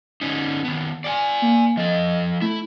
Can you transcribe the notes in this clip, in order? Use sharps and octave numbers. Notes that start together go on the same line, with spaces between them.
D3 C#4 D#4
D#3 B3
D5 G5 G#5
A#3
F3 A4 D#5
A3 E4